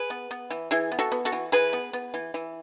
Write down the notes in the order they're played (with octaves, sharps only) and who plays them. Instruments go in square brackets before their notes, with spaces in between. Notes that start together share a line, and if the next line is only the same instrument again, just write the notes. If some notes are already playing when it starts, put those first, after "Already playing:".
Already playing: [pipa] G#4 B4
B3
B3
E3
E3 E4 G#4
B3
F#4 A4
B3
F#4 A4
E3
E3 G#4 B4
B3
B3
E3
E3